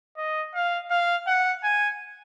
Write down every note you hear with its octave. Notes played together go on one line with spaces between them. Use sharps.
D#5
F5
F5
F#5
G#5